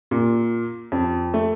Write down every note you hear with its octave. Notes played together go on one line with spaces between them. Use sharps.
A#2
F2
A3